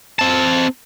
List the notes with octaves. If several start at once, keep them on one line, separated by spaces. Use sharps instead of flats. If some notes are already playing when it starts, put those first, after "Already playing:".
C4 A5